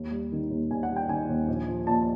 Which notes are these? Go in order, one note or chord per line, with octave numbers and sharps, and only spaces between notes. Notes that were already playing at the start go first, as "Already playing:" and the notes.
Already playing: D#2
G3
D#3
D#2
D#2 G#5
F#5
G3
G5
D#3 G#5
D#2
A#1
F3
A#2 A5